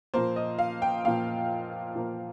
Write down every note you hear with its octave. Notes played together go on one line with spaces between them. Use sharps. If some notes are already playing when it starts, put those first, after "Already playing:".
A#2 F3 A#3 C5
D#5
F5
G5
A#2 F3 A#3 F5
A#2 F3 A#3